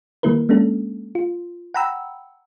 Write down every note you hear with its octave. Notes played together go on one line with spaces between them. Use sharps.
D#3 G3 A#3 E4 A#4 B4
G#3 A#3 C#4 D4 A4
F4
F#5 G5 A#5 B5 E6